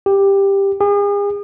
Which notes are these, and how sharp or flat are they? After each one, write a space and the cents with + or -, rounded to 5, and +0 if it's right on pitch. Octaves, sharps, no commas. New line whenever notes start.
G4 +10
G#4 -40